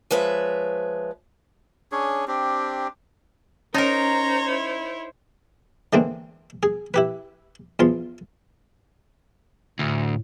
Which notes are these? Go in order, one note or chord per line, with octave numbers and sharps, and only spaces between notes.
F3 G#3 B4 C#5 E5
C#4 D4 G#4 C#5
C4 D4 G4
C#4 D#4 A#4 C5 C#5 A#5
E4
D3 E3 G#3 A#3 C4 D4
G#4
E4 G4 B4
E2 F3 F4 C6
D2 A2